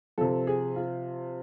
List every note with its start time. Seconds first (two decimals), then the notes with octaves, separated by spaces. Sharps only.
0.18 C3 F3 A4
0.47 G#4
0.76 F4